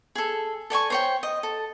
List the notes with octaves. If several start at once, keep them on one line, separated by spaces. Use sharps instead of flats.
G#4 A4
A4 D5 G#5 C#6
C5 C#5 G5
D#5
A4